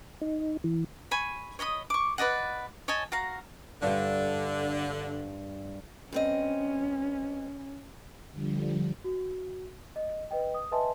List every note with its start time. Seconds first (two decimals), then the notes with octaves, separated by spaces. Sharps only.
0.21 D#4
0.64 E3
1.11 G#5 B5 C#6
1.59 C#5 D#5 B5 D#6
1.90 C#6 D6
2.18 B4 D5 D#5 F#5
2.88 C#5 D#5 G#5 A5
3.12 F#4 F5 A#5
3.83 G2 D3 G3
6.12 G2 C4 C#4 D#5
8.32 D3 F3 G3
9.04 F#4
9.96 D#5
10.31 B4 D#5 G5
10.54 D#6
10.71 B4 D#5 E5 G#5 A5 C6